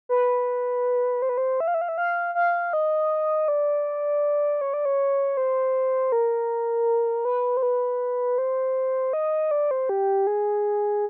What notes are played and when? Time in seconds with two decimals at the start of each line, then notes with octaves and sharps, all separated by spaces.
0.09 B4
1.22 C5
1.29 B4
1.38 C5
1.60 E5
1.68 F5
1.74 E5
1.81 F5
1.89 E5
1.98 F5
2.35 F5
2.73 D#5
3.48 D5
4.61 C#5
4.74 D5
4.85 C#5
5.37 C5
6.12 A#4
7.25 B4
7.57 C5
7.63 B4
8.38 C5
9.13 D#5
9.51 D5
9.71 C5
9.89 G4
10.27 G#4